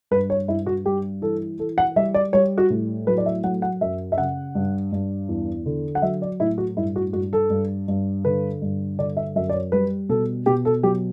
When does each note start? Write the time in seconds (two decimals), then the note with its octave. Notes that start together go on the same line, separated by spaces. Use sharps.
0.11 G2 B4
0.30 C#5
0.48 G2 E4
0.66 F#4
0.85 G3 G4
1.22 E3 A4
1.59 E3 A4
1.78 F#5
1.96 G3 E5
2.14 D5
2.33 G3 C#5
2.58 F#4
2.70 A2
3.07 F#3 B4
3.18 D5
3.26 E5
3.44 F#3 F#5
3.62 F#5
3.81 F#2 E5
4.12 E5
4.17 C#3 F#5
4.55 G2
4.92 G2
5.29 E2
5.66 D3
5.95 F#5
6.02 F#3 E5
6.22 D5
6.40 A2 E4
6.58 F#4
6.77 G2 E4
6.96 F#4
7.13 G2 F#4
7.33 A4
7.50 G2
7.88 G2
8.25 D3 B4
8.62 G2
8.99 D3 D5
9.17 E5
9.36 F#2 E5
9.49 D5
9.54 C#5
9.72 G3 B4
10.09 B2 A4
10.46 B2 G4
10.65 A4
10.83 F#3 G4